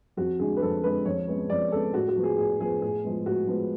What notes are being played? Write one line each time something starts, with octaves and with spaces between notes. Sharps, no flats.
F2 F#4
D3 G#3 G#4
B4
F2 A4
D3 G#3 B4
F2 C#5
C#3 G#3 B3
F2 D5
C#3 G#3 B3 A4
A2 F#4
F#4
F3 B3
G#4
A2 G#4
F3 B3 G#4
A2 G#4
F3 G#3 B3
A2 F#4
F3 G#3 B3